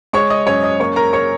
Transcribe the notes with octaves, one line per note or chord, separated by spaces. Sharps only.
G#3 C#5 C#6
D#5 D#6
F#2 C#5 C#6
D#5 D#6
A#3 C#5 C#6
A#4 A#5
C#5 C#6